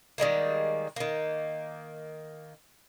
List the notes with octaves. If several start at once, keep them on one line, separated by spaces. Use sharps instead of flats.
D#3 G3 G#3 A#3
D#3 A#3